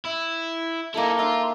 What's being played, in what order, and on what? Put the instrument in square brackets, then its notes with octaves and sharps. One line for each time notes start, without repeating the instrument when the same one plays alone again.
[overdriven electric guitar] E4
[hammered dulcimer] A#3 A4 [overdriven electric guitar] D#4 E4
[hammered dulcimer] D#4 E5 [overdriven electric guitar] F4